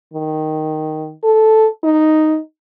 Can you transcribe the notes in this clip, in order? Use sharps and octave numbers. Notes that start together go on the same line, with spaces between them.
D#3
A4
D#4